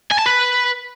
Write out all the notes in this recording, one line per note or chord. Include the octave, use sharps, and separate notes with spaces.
G#5
A5
B4